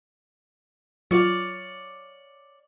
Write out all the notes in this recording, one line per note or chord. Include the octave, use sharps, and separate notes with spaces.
F#3 F4 C#5 D5 F5